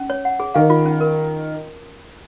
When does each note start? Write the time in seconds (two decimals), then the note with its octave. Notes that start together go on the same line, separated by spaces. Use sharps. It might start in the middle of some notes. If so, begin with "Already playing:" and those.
Already playing: C#4
0.10 C#5
0.25 F#5
0.40 G#4
0.54 D#3 F5
0.70 F4
0.86 C#4
1.01 A#4